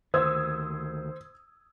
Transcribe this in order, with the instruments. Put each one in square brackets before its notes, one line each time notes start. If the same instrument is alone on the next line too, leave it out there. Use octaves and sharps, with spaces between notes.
[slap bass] D2 D#3 [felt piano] C5 [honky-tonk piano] D#6 E6 G#6